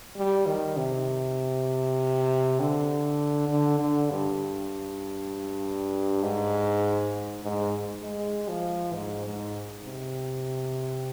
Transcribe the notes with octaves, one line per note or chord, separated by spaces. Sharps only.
G3
D#3
C3
D3
D3
D3
G2
G#2
G#2
G#3
F3
G#2
G#2
C3